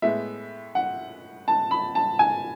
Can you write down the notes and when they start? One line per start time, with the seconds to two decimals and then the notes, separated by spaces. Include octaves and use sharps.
0.02 A2 G#3 B3 E5
0.75 F#5
1.48 A5
1.71 B5
1.95 A5
2.19 G#5